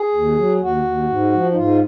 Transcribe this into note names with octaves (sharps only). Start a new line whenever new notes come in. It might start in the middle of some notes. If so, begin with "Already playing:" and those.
Already playing: G#4
D#2
F#3
D#2 F#4
D#2
G#2
F3
D#4
G#2 F4